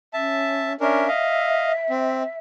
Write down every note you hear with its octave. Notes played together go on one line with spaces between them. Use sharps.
C#4 E5 A5
C#4 D4 A#4 E5
D#5 F5
C4